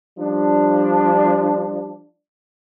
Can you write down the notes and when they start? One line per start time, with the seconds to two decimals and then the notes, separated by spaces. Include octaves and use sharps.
0.18 F3 G3 D4